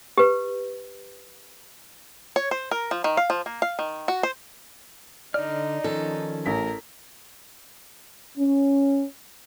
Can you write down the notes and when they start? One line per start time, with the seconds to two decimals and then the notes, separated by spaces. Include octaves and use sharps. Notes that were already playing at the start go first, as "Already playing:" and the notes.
0.18 G4 B4
2.36 C#5
2.51 C5
2.71 A#4
2.91 F3
3.04 D#3
3.17 F5
3.30 F3
3.46 A#3
3.62 F5
3.79 D#3
4.08 F#4
4.23 C5
5.34 D3 D#4 D5 F6
5.84 D#3 F3 C#4 A4
6.46 A1 A#4 B6
8.38 C#4